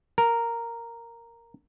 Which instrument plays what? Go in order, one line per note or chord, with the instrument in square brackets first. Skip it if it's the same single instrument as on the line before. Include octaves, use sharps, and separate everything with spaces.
[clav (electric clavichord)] A#4